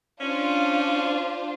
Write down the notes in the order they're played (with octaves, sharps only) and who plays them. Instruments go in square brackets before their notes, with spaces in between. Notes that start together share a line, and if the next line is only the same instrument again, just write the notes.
[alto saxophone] C#4 [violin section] D4 F4 C5